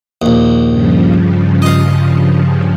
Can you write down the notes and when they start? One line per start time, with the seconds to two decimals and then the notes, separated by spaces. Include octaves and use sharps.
0.22 A#1 D#2
0.70 G2 C#3 F3
1.62 D#5 F5